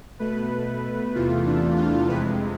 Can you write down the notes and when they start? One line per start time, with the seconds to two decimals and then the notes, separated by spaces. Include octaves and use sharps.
0.19 B2 A3 B4
1.15 E2 C3 E3 A3 F4
1.46 D4
1.76 F4
2.09 F2 C3 G#3 B4